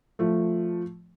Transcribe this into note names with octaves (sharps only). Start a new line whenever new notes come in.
F3 A3